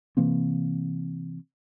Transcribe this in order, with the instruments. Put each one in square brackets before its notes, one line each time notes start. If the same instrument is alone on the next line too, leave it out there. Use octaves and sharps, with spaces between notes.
[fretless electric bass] C3 E3 A#3 C4